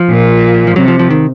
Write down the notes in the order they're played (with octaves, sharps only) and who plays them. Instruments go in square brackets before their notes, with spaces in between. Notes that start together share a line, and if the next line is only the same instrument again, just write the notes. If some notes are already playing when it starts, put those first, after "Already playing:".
Already playing: [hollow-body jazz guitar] F3
[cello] A#2
[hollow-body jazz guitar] F3
[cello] C3 [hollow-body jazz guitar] F#3
[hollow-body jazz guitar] F3
F3
D#3